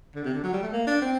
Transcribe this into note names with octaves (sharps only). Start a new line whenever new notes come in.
D3
C3
D3
F#3
G3
A3
A#3
D4
C4